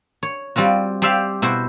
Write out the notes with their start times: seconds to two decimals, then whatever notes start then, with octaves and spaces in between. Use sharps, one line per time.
0.23 C#5
0.56 G3 C4 F4 F#4
1.02 G4 C5 D5 E5 F5
1.42 B2 E4 F#4 C5